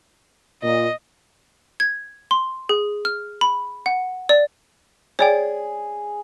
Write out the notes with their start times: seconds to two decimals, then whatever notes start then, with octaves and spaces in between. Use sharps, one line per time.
0.62 A#2 D#5
1.80 G#6
2.31 C6
2.69 G#4
3.05 F6
3.41 B5
3.86 F#5
4.29 D5
5.19 G#4 C#5 D5 G5